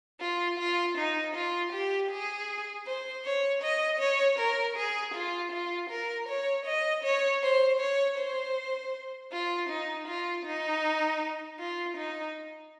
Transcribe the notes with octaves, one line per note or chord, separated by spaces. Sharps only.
F4
F4
D#4
F4
G4
G#4
C5
C#5
D#5
C#5
A#4
G#4
F4
F4
A#4
C#5
D#5
C#5
C5
C#5
C5
F4
D#4
F4
D#4
F4
D#4